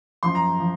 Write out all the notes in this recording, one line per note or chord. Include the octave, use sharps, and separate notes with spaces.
F#2 F3 C6
A#5
F3